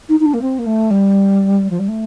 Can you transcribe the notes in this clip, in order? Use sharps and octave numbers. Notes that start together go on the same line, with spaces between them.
D#4
D#4
D4
A#3
C4
A#3
A3
G3
F3
G3
A3